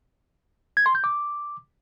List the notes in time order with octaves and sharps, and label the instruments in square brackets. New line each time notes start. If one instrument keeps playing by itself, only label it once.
[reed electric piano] G#6
C6
G6
D6